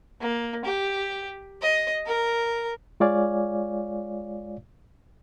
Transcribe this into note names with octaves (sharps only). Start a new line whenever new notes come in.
A#3
G4
D#5
A#4
G#3 F4 C#5 D5 F5 G#5